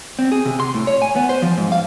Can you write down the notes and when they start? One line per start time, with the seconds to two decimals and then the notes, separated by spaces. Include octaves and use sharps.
0.19 C4
0.32 G#4
0.45 C3
0.60 C6
0.74 A2
0.87 C#5
1.02 G#5
1.16 B3
1.29 C5
1.42 F3
1.57 G#2
1.72 F5